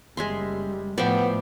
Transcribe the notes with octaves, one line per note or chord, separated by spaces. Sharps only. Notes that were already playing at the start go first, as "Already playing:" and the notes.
F#1 G3 G#3 E5 C6
A2 F3 B3 D5 E5 G5